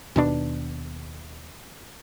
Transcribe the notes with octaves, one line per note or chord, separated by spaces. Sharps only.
D#2 B2 D4